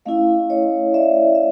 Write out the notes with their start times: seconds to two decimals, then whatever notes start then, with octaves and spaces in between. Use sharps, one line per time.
0.05 A3 C#4 E4 D#5 F5
0.50 C#5 D#5
0.94 D5 E5
1.35 E5